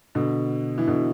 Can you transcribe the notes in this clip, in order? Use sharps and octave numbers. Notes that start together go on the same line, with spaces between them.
B2 D3
E3
B2 D3